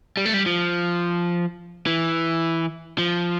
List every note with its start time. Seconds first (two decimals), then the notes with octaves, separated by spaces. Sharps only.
0.17 G3
0.26 A3
0.34 G3
0.46 F3
1.86 E3
2.98 F3